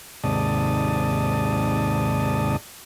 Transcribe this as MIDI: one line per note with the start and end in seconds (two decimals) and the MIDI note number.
0.24 2.56 39
0.24 2.56 44
0.24 2.56 48
0.24 2.56 74
0.24 2.56 81
0.24 2.56 87